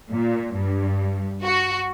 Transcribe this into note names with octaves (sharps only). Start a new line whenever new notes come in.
A#2
G2
F#4